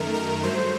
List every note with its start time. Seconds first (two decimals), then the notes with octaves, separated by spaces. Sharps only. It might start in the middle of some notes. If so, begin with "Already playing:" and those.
Already playing: F#2 D#3 A3 A#4
0.14 A#4
0.43 G2 F#3 A3 C5